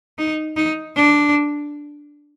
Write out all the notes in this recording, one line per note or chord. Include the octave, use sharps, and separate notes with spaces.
D#4
D#4
D4